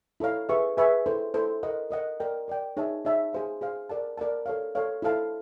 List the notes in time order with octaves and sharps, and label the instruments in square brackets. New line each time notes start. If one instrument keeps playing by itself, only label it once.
[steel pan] E4 A4 C#5 F5 A#5
G#4 B4 E5 G#5 C#6
G#4 B4 E5 G#5 C#6
E4 A4 C5
E4 A4 C5
A#4 D#5 F#5
A#4 D#5 F#5
A#4 D5 G5
A#4 D5 G5
D#4 G#4 C#5 E5 A5
D#4 G#4 C#5 E5 A5
G#4 C5 F5
G#4 C5 F5
A#4 D5 F#5 A5
A#4 D5 F#5 A5
A4 C#5 F5
A4 C#5 F5
E4 A4 C5 F5 A5